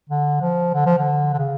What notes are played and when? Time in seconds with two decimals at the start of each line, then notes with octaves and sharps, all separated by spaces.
0.10 D3
0.41 F3
0.74 D3
0.86 F3
0.98 D3
1.33 D3
1.38 C#3